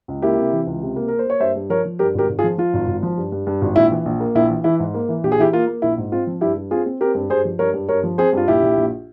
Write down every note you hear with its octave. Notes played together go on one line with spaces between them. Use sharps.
C#2
A#3 E4 G4
C3
E3
C#2
C3
A#3
A#3 A#4
C5
A#3 C#5
G2 C5 E5
G2
F3 A#4 C#5
F3
G2 G4 A#4
G#1 G4 A#4
G#1
F4 G#4
F3
F3 F4
G#1
G#1
F3
G2
G2
G2
G#1
A#1 E4
E3
A#1
A#3
A#1 E4
E3
E3 E4
G#2
A#3
E3
A#1 G4
G#4
E3 E4 G4
A#3 F4
A#3
A#1 E4
G#2
C4 F4
F3
G2 E4 G4
G2
C4 F4 G#4
C4
C4 G4 A#4
G2
G2 G#4 C5
F3
G2 A#4 C#5
G2
G2 A#4 C#5
F3
C4 G#4 C5
G2 F4
A#1 E4 G4
A#1
A#1